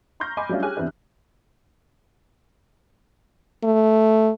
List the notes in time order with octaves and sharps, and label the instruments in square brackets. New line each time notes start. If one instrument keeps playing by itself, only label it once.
[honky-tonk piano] A#5 C6 C#6 F6 G6 A#6
D#5 G#5 B5 C6 D6
F#3 G3 A3 C#4 D4 F4
G4 G#4 C#5 G#5 F6 F#6
E2 C3 E3 D4
[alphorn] A3